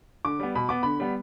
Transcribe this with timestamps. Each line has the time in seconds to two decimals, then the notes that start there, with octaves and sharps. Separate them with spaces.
0.25 D3 D6
0.40 G3 B3
0.55 B2 B5
0.69 B3 D6
0.83 D3 B5
1.00 G3 B3